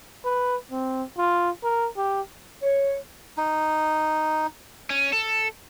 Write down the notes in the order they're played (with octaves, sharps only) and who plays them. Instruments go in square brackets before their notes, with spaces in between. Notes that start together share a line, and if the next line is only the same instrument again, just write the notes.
[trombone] B4
C4
F4
A#4
G4
[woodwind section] C#5
[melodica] D#4
[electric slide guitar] C#4
A4